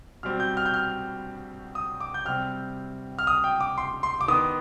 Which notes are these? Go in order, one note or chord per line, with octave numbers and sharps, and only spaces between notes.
B2 G3 C4 F6
G6
F6
G6
F6
D#6
D6
G6
C3 G3 C4 F6
F6
D#6
G5
D6
C6
C6
D6
D#3 B3 D#6